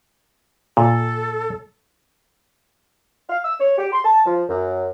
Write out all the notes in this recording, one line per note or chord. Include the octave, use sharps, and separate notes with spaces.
A#2 A4
F5
E6
C#5
G4
C6
A5
F3
F#2